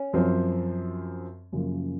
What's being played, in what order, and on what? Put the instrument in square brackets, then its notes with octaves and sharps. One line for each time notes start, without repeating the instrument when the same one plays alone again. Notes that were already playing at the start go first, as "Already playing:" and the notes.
Already playing: [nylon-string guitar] C#4
[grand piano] F#2 F3 C4
F#2 C#3 F3 A#3